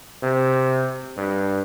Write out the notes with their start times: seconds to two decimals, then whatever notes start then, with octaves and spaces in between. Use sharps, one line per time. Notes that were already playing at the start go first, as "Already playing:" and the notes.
0.23 C3
1.17 G2